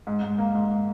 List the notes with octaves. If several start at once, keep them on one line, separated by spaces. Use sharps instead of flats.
G#2
G#2
A#3
G#2